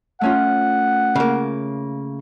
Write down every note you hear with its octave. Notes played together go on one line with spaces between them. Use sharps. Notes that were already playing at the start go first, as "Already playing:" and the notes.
A3 C#4 F4 F#5
C#3 A#3